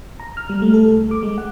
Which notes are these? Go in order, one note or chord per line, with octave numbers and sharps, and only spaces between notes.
A#5
F6
G3
A3
A4
C#2
D6
G#3
F#5